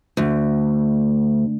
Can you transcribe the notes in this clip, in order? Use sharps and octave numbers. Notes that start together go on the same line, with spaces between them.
D2